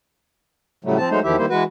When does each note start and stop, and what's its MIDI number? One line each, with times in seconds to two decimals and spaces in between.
0.84 0.97 45
0.84 0.97 49
0.84 0.97 54
0.84 0.97 55
0.84 0.97 57
0.97 1.09 53
0.97 1.09 60
0.97 1.09 81
1.10 1.20 54
1.10 1.20 56
1.10 1.20 57
1.10 1.20 63
1.10 1.20 72
1.24 1.36 40
1.24 1.36 51
1.24 1.36 53
1.24 1.36 64
1.24 1.36 67
1.24 1.36 76
1.38 1.46 51
1.38 1.46 55
1.38 1.46 58
1.38 1.46 64
1.38 1.46 72
1.50 1.63 52
1.50 1.63 56
1.50 1.63 66
1.50 1.63 71